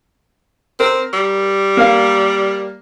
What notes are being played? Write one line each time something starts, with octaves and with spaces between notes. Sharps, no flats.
C4 A#4
G3
A#3 A#4 F5